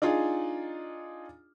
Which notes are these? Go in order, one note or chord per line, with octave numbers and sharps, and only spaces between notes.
D4 D#4 F4 G#4